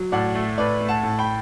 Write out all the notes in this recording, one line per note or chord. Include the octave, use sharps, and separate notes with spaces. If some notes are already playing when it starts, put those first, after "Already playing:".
Already playing: F#3
A2 D5 F#5
A3
A2 B4 D5
A3
F#5 A5
A2
G5 B5